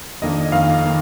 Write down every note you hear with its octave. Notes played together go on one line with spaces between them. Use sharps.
F2 D#3 A#3 D4 D#5
F2 D#3 A#3 D4 F5
D#3 A#3